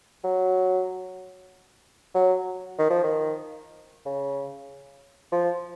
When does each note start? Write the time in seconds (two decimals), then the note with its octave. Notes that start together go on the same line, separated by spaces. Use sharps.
0.24 F#3
2.14 F#3
2.79 D#3
2.90 F3
3.04 D#3
4.06 C#3
5.32 F3